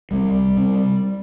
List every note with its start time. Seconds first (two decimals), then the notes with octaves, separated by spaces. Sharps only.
0.11 C2 G3
0.57 C3